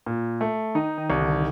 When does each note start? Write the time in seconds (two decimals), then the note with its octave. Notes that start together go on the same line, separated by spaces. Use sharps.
0.06 A#2
0.41 A3
0.75 D#3 D#4
0.98 D#3
1.10 C2
1.21 D3